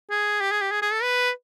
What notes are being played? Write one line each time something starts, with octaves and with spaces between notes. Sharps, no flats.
G#4
G4
G#4
G4
G#4
G#4
A4
B4